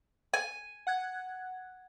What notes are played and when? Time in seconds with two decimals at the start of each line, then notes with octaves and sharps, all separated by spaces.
0.34 G#5 D#7
0.87 F#5 F#6 G#6